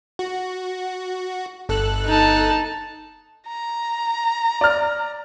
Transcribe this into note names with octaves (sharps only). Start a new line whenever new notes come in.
F#4
G1 A4 F#6
D#4 A5
A#5
D5 F6